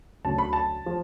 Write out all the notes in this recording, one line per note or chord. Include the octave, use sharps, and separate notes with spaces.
D2 D3 F#3 C#4 A5
B5
A5
F3